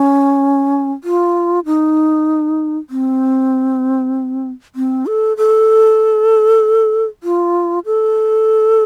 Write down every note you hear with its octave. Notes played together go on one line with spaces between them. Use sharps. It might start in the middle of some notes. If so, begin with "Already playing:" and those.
Already playing: C#4
F4
D#4
C4
C4
A4
A4
F4
A4